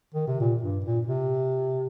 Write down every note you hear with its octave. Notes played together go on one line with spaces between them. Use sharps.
D#3
C3
A#2
G2
A#2
C3